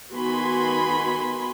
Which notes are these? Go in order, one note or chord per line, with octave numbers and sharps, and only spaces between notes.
D#3 B3 F#4 G#5 B5 C6